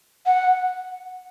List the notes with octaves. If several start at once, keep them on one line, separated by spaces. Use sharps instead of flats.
F#5